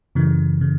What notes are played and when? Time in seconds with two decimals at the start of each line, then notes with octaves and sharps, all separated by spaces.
0.15 F#2 C#3 E3
0.61 C#3